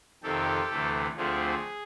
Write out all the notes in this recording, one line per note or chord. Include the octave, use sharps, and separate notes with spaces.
F2 C3 D#3 G4 A4
D2 C3 E3 A3
D2 D3 F3 A3 C4 G#4